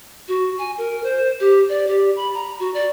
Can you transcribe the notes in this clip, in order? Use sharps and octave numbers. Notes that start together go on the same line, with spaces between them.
F#4
G#5
A#4
C5
G4
D5
G4
B5
A#5
F#4
D5